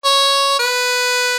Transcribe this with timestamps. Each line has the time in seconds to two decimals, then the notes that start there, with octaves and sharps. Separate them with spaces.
0.05 C#5
0.59 B4